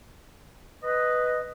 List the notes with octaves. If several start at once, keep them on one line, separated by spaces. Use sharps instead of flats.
B4 D#5